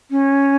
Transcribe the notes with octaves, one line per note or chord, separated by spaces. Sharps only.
C#4